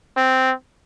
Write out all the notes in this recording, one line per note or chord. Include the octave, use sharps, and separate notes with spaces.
C4